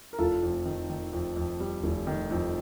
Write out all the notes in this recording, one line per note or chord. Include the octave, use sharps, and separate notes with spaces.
A#4
F1 F4 A4
F2
D#3
D#3
F2
F2
G3
F1
D#3
F2